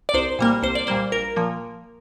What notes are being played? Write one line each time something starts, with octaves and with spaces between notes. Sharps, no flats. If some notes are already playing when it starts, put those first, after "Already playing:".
D5
C2 C5
A#2 G3 A#3
C2 C5
D5
A#2 G3 A#3 C5
A#1 A#4
A#2 F3 A#3